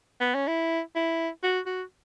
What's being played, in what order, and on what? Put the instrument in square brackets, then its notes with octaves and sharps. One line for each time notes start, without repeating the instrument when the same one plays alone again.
[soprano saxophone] B3
C#4
E4
E4
F#4
F#4